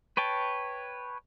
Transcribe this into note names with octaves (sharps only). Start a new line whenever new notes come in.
B4 C#5 G5 A5